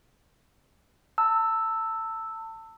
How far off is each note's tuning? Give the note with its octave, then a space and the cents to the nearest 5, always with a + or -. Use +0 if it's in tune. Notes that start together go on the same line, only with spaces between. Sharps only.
A5 +30 E6 +0